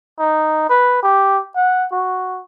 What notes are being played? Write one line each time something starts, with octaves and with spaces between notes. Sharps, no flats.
D#4
B4
G4
F#5
F#4